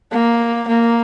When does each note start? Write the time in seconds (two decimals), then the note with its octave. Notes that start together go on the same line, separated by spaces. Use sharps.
0.12 A#3
0.68 A#3